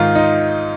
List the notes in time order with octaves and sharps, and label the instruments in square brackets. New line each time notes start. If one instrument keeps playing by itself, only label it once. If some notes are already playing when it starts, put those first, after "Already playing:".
Already playing: [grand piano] G#2 D#3 F4
D#4